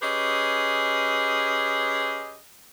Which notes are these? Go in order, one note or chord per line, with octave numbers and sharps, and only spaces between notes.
C#4 G4 G#4 B4 D#5